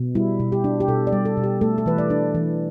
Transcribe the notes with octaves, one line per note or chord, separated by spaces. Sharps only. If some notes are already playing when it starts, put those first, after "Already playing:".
Already playing: B2
G3 E4
B2
G4
D4
G4
B2 A4
D5
G3
A4
B2
G4
A3 A4
A4
E3 B4
D5
D4
E3